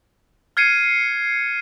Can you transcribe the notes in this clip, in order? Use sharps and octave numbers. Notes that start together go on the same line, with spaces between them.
F6 G#6 C7 C#7 D#7